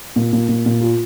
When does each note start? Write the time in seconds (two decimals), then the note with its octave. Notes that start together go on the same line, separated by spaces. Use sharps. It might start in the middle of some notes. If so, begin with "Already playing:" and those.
0.16 A#2
0.33 A#2
0.48 A#2
0.66 A#2
0.81 F4